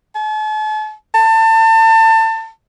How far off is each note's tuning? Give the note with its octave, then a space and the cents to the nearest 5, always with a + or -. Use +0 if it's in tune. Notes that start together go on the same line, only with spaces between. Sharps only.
A5 -45
A5 +30